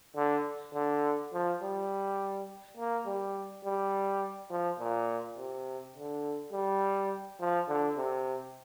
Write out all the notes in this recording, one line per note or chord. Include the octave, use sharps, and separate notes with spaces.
D3
D3
F3
G3
A#3
G3
G3
F3
A#2
C3
D3
G3
F3
D3
C3